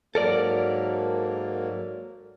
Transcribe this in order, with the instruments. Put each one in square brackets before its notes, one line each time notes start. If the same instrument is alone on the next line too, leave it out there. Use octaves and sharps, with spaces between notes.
[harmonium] G#2 F#3 A#3 [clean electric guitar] A4 A#4 D5